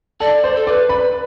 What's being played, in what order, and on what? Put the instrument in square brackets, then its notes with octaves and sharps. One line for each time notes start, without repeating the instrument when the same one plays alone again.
[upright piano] A4 [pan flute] D5
[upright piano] C5
[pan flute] A4
[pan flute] B4 [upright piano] D5
[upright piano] B5